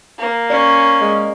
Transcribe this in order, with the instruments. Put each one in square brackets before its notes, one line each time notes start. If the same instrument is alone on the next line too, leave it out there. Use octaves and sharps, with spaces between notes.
[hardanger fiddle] A#3
[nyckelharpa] C#4 [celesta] D5
[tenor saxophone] G#3